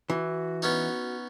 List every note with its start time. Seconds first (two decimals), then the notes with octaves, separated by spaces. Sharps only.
0.10 E3 F#4
0.62 B3 C#4 D#4